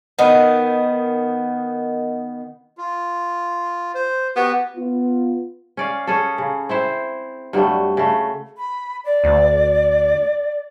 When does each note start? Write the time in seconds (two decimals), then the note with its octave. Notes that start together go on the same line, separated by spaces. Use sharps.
0.19 D#3 B3
2.78 F4
3.95 C5
4.36 B3 F#4 G4
4.77 B3 F4
5.77 C#4 D5 F5
6.07 C#4 G#4 A4
6.38 C#3
6.69 C4 E4 C5
7.53 G2 F#3 G3 A3
7.97 C#3 A3
8.57 B5
9.04 D5
9.24 D2